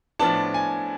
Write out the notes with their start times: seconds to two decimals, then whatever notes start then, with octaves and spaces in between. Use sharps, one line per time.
0.19 A2 F3 B3 D4 A5
0.54 G#5